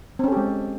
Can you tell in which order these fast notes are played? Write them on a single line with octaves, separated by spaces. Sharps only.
C4 C#4 A4 G4 G#3